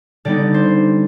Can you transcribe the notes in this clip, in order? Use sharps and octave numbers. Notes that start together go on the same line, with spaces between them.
D3 G3 B3 D#4 D5
C5